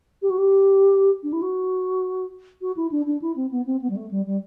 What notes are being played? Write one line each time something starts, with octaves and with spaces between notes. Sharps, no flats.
G4
F#4
G4
D4
E4
F#4
F#4
E4
D4
D4
E4
C4
B3
C4
B3
G3
A3
G3
G3